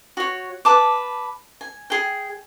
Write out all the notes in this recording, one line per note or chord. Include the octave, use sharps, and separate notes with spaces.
F#4 C#5
B4 A5 D6
G#5
G#4 G5